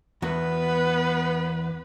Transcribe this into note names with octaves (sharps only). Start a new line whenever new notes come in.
E2 B3 F#4 B4